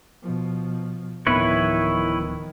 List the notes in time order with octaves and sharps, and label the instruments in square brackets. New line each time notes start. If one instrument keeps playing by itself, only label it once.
[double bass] B2 F3
[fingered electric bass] D1 A2 B3 [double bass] D#3 F3 [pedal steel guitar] E4 B4 C#5